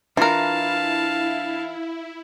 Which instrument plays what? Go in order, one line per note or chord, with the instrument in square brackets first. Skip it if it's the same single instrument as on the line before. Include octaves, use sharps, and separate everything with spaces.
[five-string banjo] E3 A#4 [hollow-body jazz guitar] D4 F4 [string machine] E4 [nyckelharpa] F5 A5